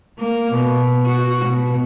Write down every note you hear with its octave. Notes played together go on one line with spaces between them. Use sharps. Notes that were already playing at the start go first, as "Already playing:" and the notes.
A#3
B2
F#4
B2